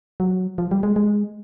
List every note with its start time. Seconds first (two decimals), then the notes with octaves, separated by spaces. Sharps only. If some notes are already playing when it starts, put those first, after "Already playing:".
0.20 F#3
0.58 F3
0.71 G3
0.83 G#3
0.96 G#3